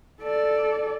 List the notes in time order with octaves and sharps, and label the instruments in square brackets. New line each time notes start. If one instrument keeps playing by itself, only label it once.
[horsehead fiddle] A4 D5